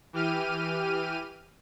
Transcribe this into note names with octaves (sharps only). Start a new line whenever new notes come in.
E3 G4 F6 D#7